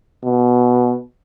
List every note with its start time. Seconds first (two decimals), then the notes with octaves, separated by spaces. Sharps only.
0.24 B2